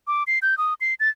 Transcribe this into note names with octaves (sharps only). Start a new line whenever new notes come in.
D6
C7
G6
D#6
C7
A6